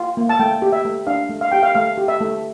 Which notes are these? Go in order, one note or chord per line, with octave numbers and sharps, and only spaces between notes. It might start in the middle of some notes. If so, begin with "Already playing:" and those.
Already playing: F4
A#3
A5
A3 G5
G4
E5
A3
D4 F5
A3
F5
G4 G5
F5
A3 F5
G4
E5
A3